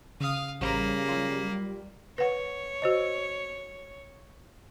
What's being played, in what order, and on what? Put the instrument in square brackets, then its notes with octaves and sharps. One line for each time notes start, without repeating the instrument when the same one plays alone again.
[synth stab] C#3 D#6 [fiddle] F5
[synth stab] A1 C5 A#5 [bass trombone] C#3 [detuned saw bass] G3 [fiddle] A#3 B5
[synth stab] F#3 F4
[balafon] B4 F#5 [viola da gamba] C#5
[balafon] F#4 C5 D#5